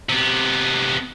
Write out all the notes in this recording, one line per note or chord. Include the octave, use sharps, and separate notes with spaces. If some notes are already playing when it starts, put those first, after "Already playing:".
C3 B3